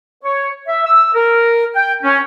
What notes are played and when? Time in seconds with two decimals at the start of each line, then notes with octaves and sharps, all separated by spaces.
0.24 C#5
0.67 E5
0.85 E6
1.14 A#4
1.75 G5
2.03 C#4